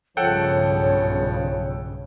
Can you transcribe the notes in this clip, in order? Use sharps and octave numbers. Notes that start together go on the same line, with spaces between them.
B1 G2 C#3 F3 A4 C#5 F#5 G5